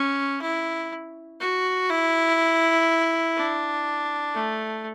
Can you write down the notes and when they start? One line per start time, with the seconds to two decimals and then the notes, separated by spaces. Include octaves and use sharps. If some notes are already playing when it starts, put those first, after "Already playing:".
Already playing: C#4
0.42 E4
1.40 F#4
1.89 E4
3.36 D4
4.34 A3